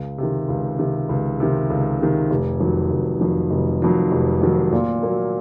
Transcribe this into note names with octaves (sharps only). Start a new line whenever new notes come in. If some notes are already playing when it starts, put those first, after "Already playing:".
Already playing: C#2
C3 D#3
C#2
C3 D#3
C#2
C3 D#3
C#2
C3 D#3
F1
F2 D#3 F#3
F1
F2 D#3 F#3
F1
F2 D#3 F#3
F1
F2 D#3 F#3
A#2
F#3 A#3